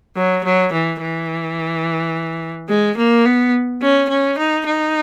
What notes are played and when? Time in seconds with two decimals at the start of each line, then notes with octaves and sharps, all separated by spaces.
0.17 F#3
0.44 F#3
0.73 E3
1.01 E3
2.69 G#3
2.97 A#3
3.26 B3
3.82 C#4
4.09 C#4
4.38 D#4
4.66 D#4